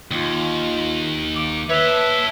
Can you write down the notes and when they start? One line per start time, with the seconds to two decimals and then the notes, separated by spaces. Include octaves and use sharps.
0.11 D#2 F4
1.36 D6
1.70 B4 C#5 E5 A5